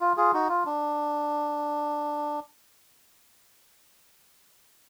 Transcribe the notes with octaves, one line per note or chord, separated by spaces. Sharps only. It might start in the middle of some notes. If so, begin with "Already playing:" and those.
F4
F4 G#4
D#4 F#4
F4
D4